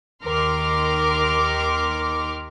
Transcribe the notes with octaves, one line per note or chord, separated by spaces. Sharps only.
D#2 D#3 A#4 C6 D6 F6